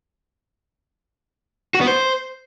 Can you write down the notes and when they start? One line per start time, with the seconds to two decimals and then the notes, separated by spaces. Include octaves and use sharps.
1.74 F#4
1.81 B3
1.87 C5